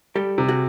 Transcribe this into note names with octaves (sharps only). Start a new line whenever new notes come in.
G3 G4 A4
C3
F#4 G#4